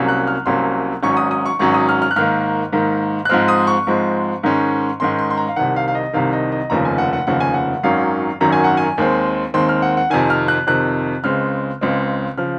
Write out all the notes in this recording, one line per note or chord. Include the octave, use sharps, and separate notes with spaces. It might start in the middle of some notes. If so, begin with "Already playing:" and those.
Already playing: C2 C3 F#3 A#3 C#4
F#6
F6
C2 C3 F#3 A#3 C#4 C6
G#1 G#2 F#3 C#4 C#6
D#6
D#6
C#6
G#1 G#2 F#3 C#4 C#6
D#6
F6
F6
F#6
G#2 D#3 A#3 F6
G#2 D#3 A#3
F#6
G#2 F3 G#3 C4 F6
D#6
C#6
G#2 F3 G#3 C4
G#2 D#3 G#3 C#4
G#2 D#3 G#3 C#4 C6
C6
C6
A#5
F5
C2 C3 D#3 F#5
F5
F5
D#5
C2 C3 D#3 F5
D#5
D#5
F1 D#2 C#3 F3 A#5
G#5
F#5
F#5
F1 D#2 C#3 F3 F#5
G#5
F#5
G#1 F#2 D#3 F#3 C#4 F5
G#1 F#2 D#3 F#3 C#4 A#5
G#5
F#5
G#5
D#2 D#3 G#3 C4
D#2 D#3 G#3 C4 C6
F6
F#5
F#5
F2 C3 D#3 G#5
F6
F#6
F2 C3 D#3 F#6
C#2 C#3 G#3 C4 F6
C#2 C#3 G#3 C4
C#3 F3 F6